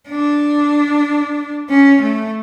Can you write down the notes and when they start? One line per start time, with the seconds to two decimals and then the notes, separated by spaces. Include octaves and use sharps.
0.09 D4
1.69 C#4
2.01 A3